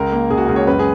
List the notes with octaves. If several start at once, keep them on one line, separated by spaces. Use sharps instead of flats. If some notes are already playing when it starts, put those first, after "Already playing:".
Already playing: C#2 A#4
A#3
C#2 G#4
F#4
C#2 G#4
C#5
F#2 B4
G#4